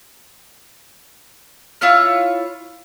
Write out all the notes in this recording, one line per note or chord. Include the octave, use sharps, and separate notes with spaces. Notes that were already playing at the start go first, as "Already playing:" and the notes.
E4 F4 C#5 F6